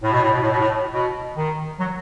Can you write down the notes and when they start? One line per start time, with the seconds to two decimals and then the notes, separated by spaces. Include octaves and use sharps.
0.03 A2
0.13 B2
0.22 A2
0.32 B2
0.41 A2
0.51 B2
0.59 A2
0.92 B2
1.36 D#3
1.80 F#3